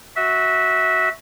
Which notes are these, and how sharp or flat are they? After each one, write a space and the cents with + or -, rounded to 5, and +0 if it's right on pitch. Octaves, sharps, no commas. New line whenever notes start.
F#4 +0 E5 -20